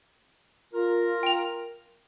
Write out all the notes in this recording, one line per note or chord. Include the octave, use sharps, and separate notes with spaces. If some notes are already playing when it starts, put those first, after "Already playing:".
F4 A#4
G5 F7